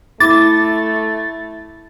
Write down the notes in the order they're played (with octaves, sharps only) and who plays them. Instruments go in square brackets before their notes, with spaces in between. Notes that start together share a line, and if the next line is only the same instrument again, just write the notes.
[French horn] A3 [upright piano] E4 [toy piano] D6 [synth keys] A6